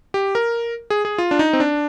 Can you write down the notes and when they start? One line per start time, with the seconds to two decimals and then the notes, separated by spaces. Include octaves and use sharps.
0.14 G4
0.35 A#4
0.90 G#4
1.05 G#4
1.18 F4
1.31 D4
1.39 D#4
1.53 C4
1.60 D4